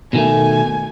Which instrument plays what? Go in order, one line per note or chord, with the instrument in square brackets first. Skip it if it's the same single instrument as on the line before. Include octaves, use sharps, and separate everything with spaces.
[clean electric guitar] B2 D#3 A3 [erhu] G#5